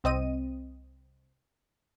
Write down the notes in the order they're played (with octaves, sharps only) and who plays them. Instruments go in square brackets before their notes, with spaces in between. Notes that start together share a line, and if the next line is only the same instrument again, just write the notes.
[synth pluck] C2 C4 D#5 D#7